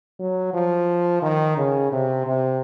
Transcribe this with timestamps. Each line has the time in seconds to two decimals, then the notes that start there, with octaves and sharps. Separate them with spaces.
0.19 F#3
0.54 F3
1.22 D#3
1.57 C#3
1.92 C3
2.27 C3